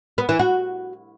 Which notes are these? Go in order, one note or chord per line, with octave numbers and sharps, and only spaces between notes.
B3
E3
F#4